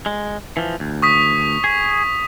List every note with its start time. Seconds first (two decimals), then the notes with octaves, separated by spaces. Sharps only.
0.06 G#3
0.57 E3 F3
0.80 D2
1.02 C#6 D#6 B6
1.64 G#4